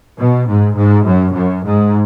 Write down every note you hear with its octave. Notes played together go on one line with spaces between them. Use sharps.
B2
G#2
G#2
F#2
F#2
G#2